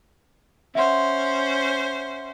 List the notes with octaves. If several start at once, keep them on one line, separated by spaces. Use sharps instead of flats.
C#4 C5 E5 F#5 C6